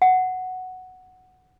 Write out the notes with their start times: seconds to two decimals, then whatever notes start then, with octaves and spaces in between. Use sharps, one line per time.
0.02 F#5